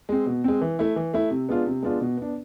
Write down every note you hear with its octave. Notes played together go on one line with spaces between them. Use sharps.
G#3 C4
B2
G#3 C4
E3
A3 E4
E3
A3 E4
C3
G#3 B3 D4 F4
C3
G#3 B3 D4 F4
B2
B3 D4